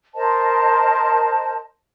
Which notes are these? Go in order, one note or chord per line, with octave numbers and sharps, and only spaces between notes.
A#4 C5 D#5 A5